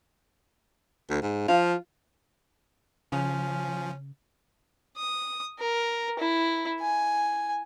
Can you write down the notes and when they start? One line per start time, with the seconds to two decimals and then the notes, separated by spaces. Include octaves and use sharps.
1.10 D2
1.22 G#2
1.48 F3 F4
3.12 C#3 F3 C#4
4.97 D#6
5.59 A#4
6.19 E4
6.81 G#5